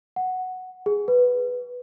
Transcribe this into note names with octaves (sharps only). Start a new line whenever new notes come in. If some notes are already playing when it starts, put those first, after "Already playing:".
F#5
G#4
B4